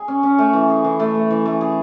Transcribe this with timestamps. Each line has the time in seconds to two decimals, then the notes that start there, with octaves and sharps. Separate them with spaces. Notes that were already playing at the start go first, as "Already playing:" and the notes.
Already playing: G#4
0.08 C#4
0.23 C#4
0.38 A3
0.53 E3
0.69 G#4
0.84 E3
1.00 A3
1.15 A3
1.31 E3
1.46 A3
1.61 G#4